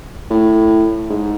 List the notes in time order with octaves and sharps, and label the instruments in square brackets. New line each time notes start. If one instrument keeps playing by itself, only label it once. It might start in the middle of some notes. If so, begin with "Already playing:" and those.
[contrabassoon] A2
G#2